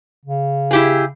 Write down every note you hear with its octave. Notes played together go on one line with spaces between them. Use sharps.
C#3
E4 G4 G#4